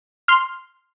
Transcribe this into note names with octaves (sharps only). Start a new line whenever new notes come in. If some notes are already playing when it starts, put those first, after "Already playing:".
C6 F6